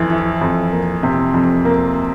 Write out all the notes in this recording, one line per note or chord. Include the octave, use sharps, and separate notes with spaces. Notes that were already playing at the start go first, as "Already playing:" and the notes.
Already playing: F2 E3
E3
F2
A#3
C3
F2
A#3